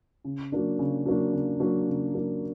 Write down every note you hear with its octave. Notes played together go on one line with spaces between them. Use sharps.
C#3
F#3 A#3 D4
C#3
F#3 A#3 D4
C#3
F#3 A#3 D4
C#3
F#3 A#3 D4